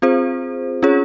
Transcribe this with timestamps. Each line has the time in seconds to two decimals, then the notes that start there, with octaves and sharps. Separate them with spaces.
0.02 C4 F4 G#4 C5
0.82 C#4 F4 G#4 C#5